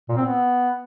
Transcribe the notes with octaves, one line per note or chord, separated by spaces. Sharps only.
A#2
C4
B3